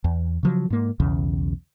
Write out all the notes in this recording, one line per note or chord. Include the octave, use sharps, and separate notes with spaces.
E2
C#3 F3 F#3
G#2 A#3
B1 E2 C#3